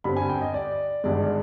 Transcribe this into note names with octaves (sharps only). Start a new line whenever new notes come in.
G2 D3 G3 C4 B5
G#5
G5
D#5
D5
G#1 G2 D3 G#3 D5